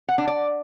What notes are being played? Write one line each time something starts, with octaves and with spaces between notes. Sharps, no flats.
F#5
D4
D5